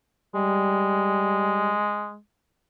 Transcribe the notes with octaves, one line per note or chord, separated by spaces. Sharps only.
G3 G#3